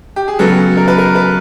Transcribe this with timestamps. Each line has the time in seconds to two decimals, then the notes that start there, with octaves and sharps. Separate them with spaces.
0.16 G4
0.28 G#4
0.39 C#3 F#3 B3 A4
0.77 A#4
0.88 B4
0.98 A#4
1.15 B4